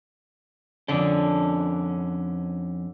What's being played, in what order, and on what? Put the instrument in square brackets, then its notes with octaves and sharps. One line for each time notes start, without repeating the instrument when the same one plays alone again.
[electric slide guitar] F2 C#4 [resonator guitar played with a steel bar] D3 D4